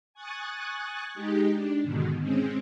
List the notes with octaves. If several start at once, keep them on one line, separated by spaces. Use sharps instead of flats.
G#5 C#6 D#6 F#6 G#6 A6
G#3 D#4 G4
D4
G#2 B2 D3 D#3
G#3 C4 C#4